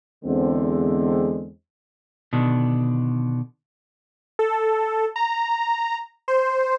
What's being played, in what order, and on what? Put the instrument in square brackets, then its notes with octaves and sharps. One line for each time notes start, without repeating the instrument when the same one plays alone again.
[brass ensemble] E2 D3 G#3 C4
[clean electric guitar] B2 D3 D#3 D4
[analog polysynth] A4
A#5
C5